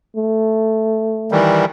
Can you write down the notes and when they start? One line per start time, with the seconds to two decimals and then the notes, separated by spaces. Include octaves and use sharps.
0.17 A3
1.32 D#3 E3 G3